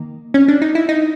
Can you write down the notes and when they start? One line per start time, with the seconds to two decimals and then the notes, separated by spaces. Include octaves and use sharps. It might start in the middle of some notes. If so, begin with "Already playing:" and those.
Already playing: D#3 A#3
0.34 C#4
0.48 D4
0.62 D#4
0.75 E4
0.89 D#4